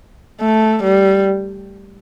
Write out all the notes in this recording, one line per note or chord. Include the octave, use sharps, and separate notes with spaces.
A3
G3